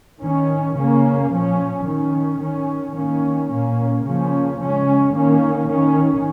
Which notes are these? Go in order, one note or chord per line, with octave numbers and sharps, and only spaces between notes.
D#3 C#4
C#3 A#3 C#4
A#2 F3 C#4
D#3 C#4
D#3 C#4
D#3 A#3 C#4
A#2 A#3 C#4
C#3 F3 A#3 C#4
C#3 G#3 C#4
D#3 A#3 C#4
D#3 C#4